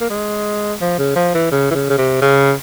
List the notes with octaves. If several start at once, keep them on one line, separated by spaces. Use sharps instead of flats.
A#3
G#3
F3
C#3
F3
E3
C#3
E3
C#3
C#3
C3
C#3